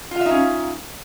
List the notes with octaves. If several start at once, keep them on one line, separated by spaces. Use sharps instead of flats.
C#4 D#4 F4 E5 F5